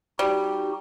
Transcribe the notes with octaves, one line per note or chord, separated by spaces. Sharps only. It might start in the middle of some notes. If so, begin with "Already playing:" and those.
G3 D#4 F#4 G4